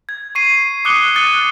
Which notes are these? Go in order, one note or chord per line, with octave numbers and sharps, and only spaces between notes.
G#6
C#6 C7 D#7
D6 D#6 F#6 C#7 G7
D#6 F#6 A6 C#7 D#7 G7